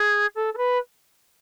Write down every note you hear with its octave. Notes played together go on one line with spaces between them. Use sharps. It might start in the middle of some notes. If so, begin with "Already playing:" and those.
Already playing: G#4
A4
A4
B4